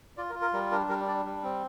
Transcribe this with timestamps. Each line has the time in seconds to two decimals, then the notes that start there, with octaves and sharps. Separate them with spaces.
0.17 F4 D5
0.30 A#4
0.35 F4
0.42 A#4
0.53 G3 A#4
0.72 D4 A#4
0.89 G3 A#4
1.07 D4 D5
1.25 G3
1.43 C4